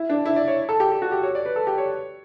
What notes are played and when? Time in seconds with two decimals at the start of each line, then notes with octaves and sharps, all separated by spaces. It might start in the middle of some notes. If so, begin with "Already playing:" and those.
Already playing: E4
0.09 D4
0.26 E4
0.36 D5
0.48 C#5
0.69 A4
0.80 G4
0.91 G4
1.02 F#4
1.12 G4
1.23 C#5
1.35 D5
1.46 B4
1.56 A4
1.67 G4
1.78 C#5